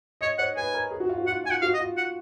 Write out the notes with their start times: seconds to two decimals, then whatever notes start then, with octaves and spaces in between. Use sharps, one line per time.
0.21 C#5 D#5
0.38 C#5 F#5
0.57 B4 G#5
0.74 A#4
0.91 G#4
1.00 F#4
1.09 F4
1.18 F#4
1.27 F4 F#5
1.44 F4 G#5
1.51 F#5
1.62 F#4 F5
1.74 D#5
1.80 F4
1.97 F#5